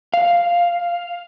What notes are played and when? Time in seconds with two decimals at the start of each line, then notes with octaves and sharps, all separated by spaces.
0.14 F5